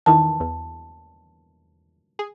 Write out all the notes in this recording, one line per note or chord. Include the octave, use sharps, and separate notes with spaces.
E2 D#3 E3 A5
E2
G#4